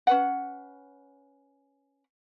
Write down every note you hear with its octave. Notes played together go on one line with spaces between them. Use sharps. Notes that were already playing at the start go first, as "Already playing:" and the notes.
C#4 B4 F#5